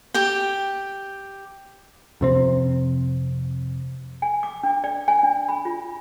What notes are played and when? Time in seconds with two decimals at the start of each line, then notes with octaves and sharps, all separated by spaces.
0.14 G4 G5
2.21 F2 C3 C4
4.22 G#5
4.43 D6
4.63 D4
4.84 D5
5.08 G#5
5.23 D4
5.49 B5
5.65 F4